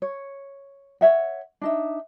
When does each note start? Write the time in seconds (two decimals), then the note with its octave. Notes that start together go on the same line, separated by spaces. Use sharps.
0.02 C#5
1.01 C#5 E5 F#5
1.61 D4 D#4 E5